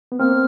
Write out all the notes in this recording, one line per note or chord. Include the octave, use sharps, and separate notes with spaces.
B3
A#3 C4 F6